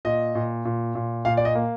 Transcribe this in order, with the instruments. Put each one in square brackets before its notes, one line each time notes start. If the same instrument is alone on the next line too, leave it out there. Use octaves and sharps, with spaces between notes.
[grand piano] A#2 D#5
A#2
A#2
A#2
A#2 F5
D5
D#5
A#3